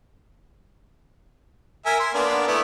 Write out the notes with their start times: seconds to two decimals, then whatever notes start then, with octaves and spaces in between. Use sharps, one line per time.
1.86 A#4 E5 G#5
2.00 C6
2.14 A#3 B3 D4
2.48 A3 B3 E4